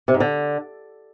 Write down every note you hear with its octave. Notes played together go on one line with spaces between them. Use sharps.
C3
G#2
D3